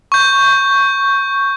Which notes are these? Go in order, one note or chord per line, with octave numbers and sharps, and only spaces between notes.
C#6 G6